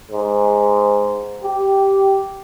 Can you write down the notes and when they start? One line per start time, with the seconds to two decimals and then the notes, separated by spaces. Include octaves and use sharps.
0.11 G#2
1.43 G4